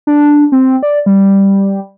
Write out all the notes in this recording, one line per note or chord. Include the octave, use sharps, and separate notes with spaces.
D4
C4
D5
G3